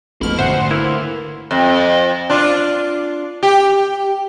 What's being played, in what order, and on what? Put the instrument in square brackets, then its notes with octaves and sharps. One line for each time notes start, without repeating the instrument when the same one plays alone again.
[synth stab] A1 F6 [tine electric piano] F2 G#2 B2 [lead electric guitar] F4 B5
[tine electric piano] G#1 [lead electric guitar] D2 [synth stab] C5 E5 [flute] F#5
[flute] C6
[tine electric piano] A#3 B4 F6 [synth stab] E4
[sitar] F2
D4 F4
G4